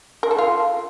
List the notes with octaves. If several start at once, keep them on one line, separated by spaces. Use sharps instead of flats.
A#4
A4
F4